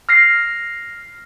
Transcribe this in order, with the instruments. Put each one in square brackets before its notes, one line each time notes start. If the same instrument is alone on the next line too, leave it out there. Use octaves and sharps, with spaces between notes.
[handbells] F6 A#6 C7